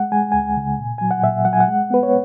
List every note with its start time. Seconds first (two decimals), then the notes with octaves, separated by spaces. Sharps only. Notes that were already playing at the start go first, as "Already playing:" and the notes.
Already playing: G#3 F#5
0.12 G#3 G#5
0.32 C#2 G#5
0.57 C#3
0.78 A#2
0.98 F#3 G#5
1.11 F#5
1.23 A#2 E5
1.45 F#3 F#5
1.53 G#5
1.60 F#5
1.68 G#3
1.90 B3 B4
2.03 C#5